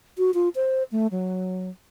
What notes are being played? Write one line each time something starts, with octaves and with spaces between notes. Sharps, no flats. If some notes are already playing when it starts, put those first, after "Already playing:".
F#4
F4
C5
A3
F#3